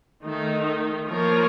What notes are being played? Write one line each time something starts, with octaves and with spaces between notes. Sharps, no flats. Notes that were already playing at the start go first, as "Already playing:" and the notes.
D#3 A3 D#4
F3 A#3 F4 A#4 C#5